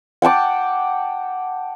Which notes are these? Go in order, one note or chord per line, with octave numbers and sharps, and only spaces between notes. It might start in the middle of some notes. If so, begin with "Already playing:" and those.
F#5 G5 A5 D6